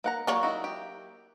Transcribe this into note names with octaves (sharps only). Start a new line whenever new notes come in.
A#3 F#5 A#5
F#3 A#3 C#5 D5 F#5
D#4 E4 F#4
G4